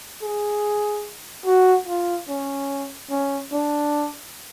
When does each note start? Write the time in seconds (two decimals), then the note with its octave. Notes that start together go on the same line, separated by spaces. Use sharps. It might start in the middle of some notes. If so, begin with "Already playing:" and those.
0.22 G#4
1.46 F#4
1.87 F4
2.28 C#4
3.10 C#4
3.52 D4